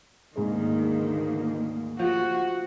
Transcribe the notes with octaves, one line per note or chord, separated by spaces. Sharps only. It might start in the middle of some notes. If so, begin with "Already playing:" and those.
D2 G#2 D#3 G#3 A#3
F3 F#4